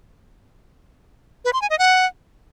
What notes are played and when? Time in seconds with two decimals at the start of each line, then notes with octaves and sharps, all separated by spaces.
1.45 B4
1.53 C6
1.62 G#5
1.70 D#5
1.79 F#5